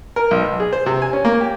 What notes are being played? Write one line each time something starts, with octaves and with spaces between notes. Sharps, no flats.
A#4
B1
B1
G#4
C5
C3
G#5
C#4
A#3
G4